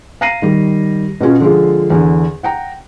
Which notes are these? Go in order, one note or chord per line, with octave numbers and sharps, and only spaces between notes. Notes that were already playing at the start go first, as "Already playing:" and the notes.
F5 A#5 A#6 C7 D#7
D#3 G3
B2 B3 C#4 F4
D3 F3 G#3 F4
E2 D3
F#5 G5 A#5